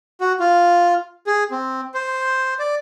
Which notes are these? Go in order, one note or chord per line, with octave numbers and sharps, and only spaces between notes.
F#4
F4
G#4
C4
C5
D5